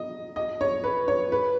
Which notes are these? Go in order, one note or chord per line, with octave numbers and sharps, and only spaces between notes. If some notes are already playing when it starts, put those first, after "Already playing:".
Already playing: D#5
D#5
C#5
B4
C#5
B4